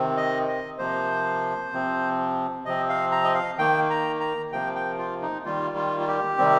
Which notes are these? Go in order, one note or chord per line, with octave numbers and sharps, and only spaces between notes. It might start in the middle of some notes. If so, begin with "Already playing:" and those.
Already playing: C3 D#3 C4
D#5
D#5
C3 F3 A#3 C5
C3 F3 C4
C3 F3 C4 D#5
F5
A#5
D#5
F5
D#3 A#3 G5
A#5
A#5
C3 F3 A#3 G5
G5
F4
D#4
D#3 G3 A#3 F4
F4
F4
G4
C3 D#3 G3 C4